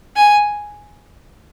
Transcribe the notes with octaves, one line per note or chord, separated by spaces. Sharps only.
G#5